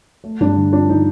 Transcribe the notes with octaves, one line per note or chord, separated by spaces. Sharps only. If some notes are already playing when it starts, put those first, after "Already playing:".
A3
G2 D4
D3
F3 D4
D3 D#4